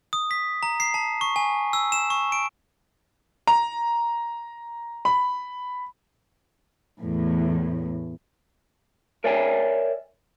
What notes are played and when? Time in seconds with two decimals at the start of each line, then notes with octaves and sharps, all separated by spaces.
0.13 D#6
0.31 B6
0.63 A#5
0.80 C7
0.94 A5
1.21 C#6
1.36 G#5
1.73 E6
1.92 E7
2.10 C#6
2.32 D7
3.47 A#5
5.05 B5
7.01 E2 A2
9.24 A#4 C#5 D5 E5 G5 G#5